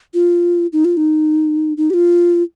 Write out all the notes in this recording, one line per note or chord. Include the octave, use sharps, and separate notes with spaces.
F4
D#4
F4
D#4
D#4
G4
F4